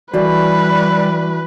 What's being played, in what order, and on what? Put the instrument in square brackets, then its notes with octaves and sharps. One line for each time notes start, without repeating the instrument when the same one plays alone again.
[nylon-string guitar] E3 A4 D5 [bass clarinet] G3 [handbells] F#4 [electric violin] B4